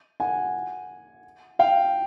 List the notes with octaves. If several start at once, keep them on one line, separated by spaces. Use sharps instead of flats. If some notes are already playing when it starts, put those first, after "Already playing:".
F#5 G#5
F5 G5